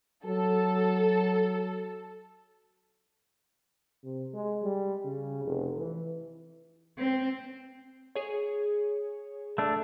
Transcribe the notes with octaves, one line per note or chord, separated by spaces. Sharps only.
F#3 A4
C3
G#3
G3
C#3
F1
E3
C4
G#4 C#5
A3 D4